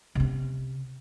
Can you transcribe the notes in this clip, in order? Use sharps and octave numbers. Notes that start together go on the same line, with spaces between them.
C3 C#4